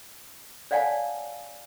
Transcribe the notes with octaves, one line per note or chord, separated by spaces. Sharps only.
C#5 D5 F5 F#5 G#5 A5